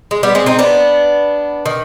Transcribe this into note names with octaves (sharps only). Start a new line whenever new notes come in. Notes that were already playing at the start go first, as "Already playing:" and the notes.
G#3
G3 B3
G#3 C4
C4 D#4
B3 D4
D#3